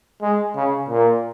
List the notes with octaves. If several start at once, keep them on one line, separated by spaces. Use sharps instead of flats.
G#3
C#3
A#2